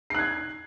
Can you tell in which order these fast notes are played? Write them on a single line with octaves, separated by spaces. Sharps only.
C7 F#6 G#6